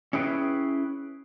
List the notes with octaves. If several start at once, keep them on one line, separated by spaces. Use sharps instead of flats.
C#4 E4 G#4 B4 G5